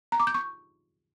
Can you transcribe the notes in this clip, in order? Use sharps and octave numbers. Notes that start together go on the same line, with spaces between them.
A#5
D6
G6
C#6